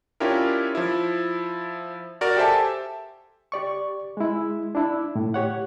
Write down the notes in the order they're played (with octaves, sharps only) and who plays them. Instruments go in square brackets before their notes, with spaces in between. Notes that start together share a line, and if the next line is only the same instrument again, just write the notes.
[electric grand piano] C#4 D4 E4 F4 G4 A#4
F3 E4
F#4 A#4 D5
G4 A4 C5 E5 G#5 A5
[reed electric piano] G4 D5 C#6
G#3 E4
D4 E4
A2
G4 C#5 F#5